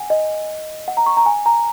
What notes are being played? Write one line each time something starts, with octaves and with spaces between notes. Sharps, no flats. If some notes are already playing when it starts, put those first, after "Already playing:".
Already playing: F#5 G#5
D#5
F#5
A#5
C#6
A#5
G#5
A#5